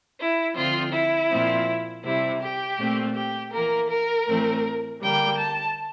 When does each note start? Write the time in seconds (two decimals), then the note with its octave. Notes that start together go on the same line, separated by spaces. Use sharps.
0.18 E4
0.55 D3 F3 C4 F4
0.92 E4
1.29 A#2 F3 C4
2.04 C3 G3 C4 E4
2.41 G4
2.78 A#2 A3 C4
3.15 G4
3.52 E3 A#3 A#4
3.89 A#4
4.27 A2 E3 A3 C4
5.02 D3 G3 A#3 G5
5.38 A5